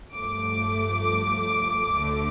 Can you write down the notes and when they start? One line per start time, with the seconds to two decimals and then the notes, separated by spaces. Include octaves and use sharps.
0.14 G2 F3 A3 D6
1.91 D2 D3 A3